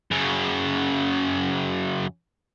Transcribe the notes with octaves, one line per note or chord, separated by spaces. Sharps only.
F#2 C#3